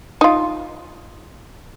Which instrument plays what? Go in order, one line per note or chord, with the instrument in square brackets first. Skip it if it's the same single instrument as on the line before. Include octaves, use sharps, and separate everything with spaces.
[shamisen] D#4 F4